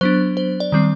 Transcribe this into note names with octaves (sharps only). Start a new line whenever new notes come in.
F#3 B3 D4 C5
C5
D5
D#3 G3 C4